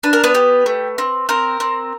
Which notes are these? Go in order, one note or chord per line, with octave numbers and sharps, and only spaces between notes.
D4 B4
A#4
B3 B4
G4
A3
C4
C4 A#4
C4